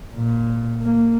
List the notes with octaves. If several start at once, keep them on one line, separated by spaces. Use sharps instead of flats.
A#2
A#3